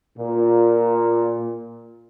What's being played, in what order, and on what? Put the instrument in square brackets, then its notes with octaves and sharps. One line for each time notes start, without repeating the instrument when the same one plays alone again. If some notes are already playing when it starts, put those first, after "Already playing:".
[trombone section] A#2